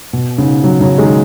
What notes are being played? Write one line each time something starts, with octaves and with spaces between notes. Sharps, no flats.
B2
G#2 C#3
C#3 F#3
C#3 F#3
D#3 G#3